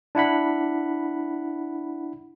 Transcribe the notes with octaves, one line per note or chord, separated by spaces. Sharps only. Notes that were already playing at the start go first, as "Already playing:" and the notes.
D4 E4 F#5 B5